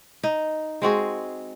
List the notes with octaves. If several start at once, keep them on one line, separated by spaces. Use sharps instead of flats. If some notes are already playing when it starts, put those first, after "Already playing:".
D#4
G#3 C4 F#4 G#4